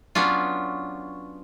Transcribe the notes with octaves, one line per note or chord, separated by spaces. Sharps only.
F#3 B3 C#4 D4 F4